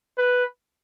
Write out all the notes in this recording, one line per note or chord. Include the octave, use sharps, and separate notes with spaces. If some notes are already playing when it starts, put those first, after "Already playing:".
B4